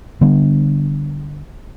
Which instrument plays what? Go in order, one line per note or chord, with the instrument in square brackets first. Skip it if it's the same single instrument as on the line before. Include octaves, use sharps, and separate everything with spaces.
[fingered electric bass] D3 G3 B3 D4